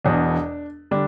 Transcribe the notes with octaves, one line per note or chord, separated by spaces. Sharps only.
E1 E2 B2 D4
D3 G3 D4